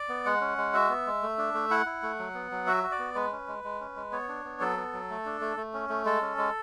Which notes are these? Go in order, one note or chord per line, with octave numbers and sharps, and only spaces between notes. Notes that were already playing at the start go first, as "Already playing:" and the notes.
Already playing: D5
B3
G#3 F#5
C#4
G#3
F#4 E5
B3
G#3
A3
D4
A3
E4 F#5
E4
A3
F#3
B3
F#3
F#4 E5
F#4
D5
B3
G#3 B4
C#4
G#3
G#3
C#4
G#3
B3 C#5
D4
B3
F#3 A4
B3
F#3
A3
D4
A3
A3
C#4
A3
G#3 A4
C#4
G#3